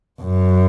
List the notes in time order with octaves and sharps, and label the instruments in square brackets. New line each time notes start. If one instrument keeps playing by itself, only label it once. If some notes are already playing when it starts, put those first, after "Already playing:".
[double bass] F#2